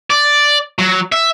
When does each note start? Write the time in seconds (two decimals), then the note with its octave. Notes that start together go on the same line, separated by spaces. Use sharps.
0.10 D5
0.79 F#3
1.12 E5